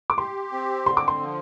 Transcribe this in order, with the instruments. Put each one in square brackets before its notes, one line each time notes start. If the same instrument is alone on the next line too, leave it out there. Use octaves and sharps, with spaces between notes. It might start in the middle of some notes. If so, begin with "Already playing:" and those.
[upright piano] D6
[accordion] G4 [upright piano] C6
[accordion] C4
[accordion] D3 [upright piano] C6
[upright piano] D6
C6
[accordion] F3